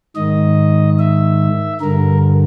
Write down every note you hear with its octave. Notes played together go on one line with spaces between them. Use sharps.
G#2 D#3 D#5
E5
G2 D3 A#4